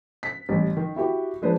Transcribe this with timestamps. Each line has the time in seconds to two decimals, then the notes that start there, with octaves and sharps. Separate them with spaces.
0.23 B6
0.49 A1 G3
0.77 D#3
0.96 E4 F#4 G4
1.42 F3 G#3 A#3 D4 B4 C5